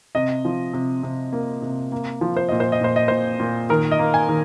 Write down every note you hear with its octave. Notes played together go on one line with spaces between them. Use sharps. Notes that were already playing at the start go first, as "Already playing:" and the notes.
C3 D#5
F3
C3
C3
A#3
C3
A#3
F3
C5
A#2 D#5
C5
D#5
A#2 C5
D#5
A#2 C5
A#2
D#3 A#4
D#5
A#3
G#5
D#3